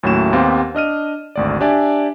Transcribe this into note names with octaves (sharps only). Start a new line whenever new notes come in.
D#2 A2 F#3 A3 C#4 E7
D#2 B3 C4 G4 F5 C6
D4 D#5 F6 D#7
G#1 D2 D5
D4 G4 D5 E5 G#5